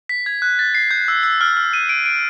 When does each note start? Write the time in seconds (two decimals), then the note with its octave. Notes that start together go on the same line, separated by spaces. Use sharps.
0.09 B6
0.26 G#6
0.42 F#6
0.59 A6
0.75 C7
0.91 G6
1.08 E6
1.23 E6
1.41 F6
1.57 F6
1.73 D#7
1.89 D7
2.06 D7